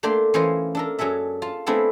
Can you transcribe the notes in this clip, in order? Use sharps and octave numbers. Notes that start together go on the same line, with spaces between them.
A3 A#3 D4 D5 G5 C6
E3 C#4 F4 C5 D#5 F5
D4 A4 A#4
F#2 F#3 G#4 A4 E5
F4 A5
A3 B3 C4 D4 E4 G#4